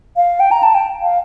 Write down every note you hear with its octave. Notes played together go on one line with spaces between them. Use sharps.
F5
G5
A#5
A5
G5
F5